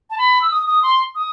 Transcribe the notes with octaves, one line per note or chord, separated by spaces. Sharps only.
A5
B5
E6
D#6
D#6
C6
D#6